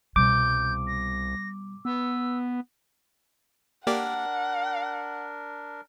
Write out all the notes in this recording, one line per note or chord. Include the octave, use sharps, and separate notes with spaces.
C2 B2 G3 D6 G6
A#6
B3 E6
A#3 D4 G4 A#4 D5 F#5